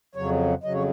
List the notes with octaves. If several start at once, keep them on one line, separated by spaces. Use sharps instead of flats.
F2 C#3 F#3 C#5
F2 C#3 F#3 D#5
C#5